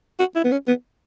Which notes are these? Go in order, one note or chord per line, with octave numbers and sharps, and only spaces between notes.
F#4
E4
B3
C#4
B3